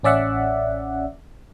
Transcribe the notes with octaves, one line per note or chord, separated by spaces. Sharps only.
A1 C#4 D5 E5 F#5